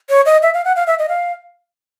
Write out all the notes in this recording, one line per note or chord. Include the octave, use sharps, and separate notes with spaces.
C#5
D#5
E5
F5
F#5
F5
E5
D#5
F5